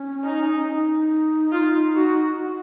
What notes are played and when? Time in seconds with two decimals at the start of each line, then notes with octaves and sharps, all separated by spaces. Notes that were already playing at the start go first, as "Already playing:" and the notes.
Already playing: C#4
0.24 D#4
0.66 D#4
1.51 F4
1.95 F#4
2.36 F#4